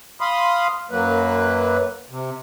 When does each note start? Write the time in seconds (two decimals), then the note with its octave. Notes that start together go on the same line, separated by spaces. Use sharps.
0.21 F5 B5 C6 D#6
0.91 F#2 F#3 A#3 B4
2.10 C3